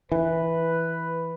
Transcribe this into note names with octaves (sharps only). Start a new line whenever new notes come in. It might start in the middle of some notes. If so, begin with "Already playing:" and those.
E3 B4